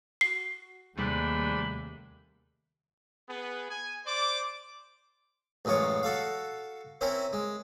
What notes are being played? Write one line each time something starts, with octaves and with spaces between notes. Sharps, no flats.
F#4 C7
D#2 G#2 C3 G3 A3 D4 B4
B3 G#4
G#5
C5 D5 D6
A1 F#2 G#3 F4 C#5
F#4 A4 F5
C4 C#4 E4 A#4
G#3